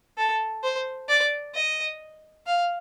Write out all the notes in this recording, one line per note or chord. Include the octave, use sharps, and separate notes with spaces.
A4
C5
D5
D#5
F5